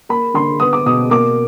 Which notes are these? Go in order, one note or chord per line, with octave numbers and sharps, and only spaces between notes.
A#3 B5
D3 C6
B3 D#6
D6
B2 D#6
A#3 D6